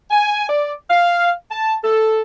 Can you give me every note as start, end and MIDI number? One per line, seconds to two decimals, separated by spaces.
0.11 0.49 80
0.49 0.74 74
0.90 1.31 77
1.51 1.76 81
1.84 2.21 69